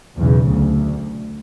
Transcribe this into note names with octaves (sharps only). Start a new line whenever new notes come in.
B1 E2 C#3
D2